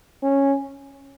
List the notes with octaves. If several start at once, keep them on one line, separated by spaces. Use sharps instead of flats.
C#4